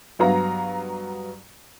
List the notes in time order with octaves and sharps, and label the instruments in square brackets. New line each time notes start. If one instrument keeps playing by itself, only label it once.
[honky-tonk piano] G2 F#3 B3 F5 A#5